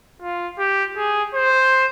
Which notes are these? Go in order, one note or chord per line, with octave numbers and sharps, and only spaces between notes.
F4
G4
G#4
C5